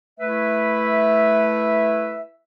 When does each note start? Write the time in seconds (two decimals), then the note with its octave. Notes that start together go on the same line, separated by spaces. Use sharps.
0.20 A3 E4 B4 E5